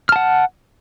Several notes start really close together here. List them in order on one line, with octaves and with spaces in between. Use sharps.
F6 A5 F#5